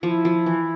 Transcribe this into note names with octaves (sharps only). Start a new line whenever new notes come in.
F3 E4
F3
E3